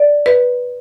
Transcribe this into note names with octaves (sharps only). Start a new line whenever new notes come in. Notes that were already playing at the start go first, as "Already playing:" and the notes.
Already playing: D5
B4